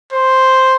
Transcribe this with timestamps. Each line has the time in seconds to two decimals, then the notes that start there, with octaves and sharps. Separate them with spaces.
0.13 C5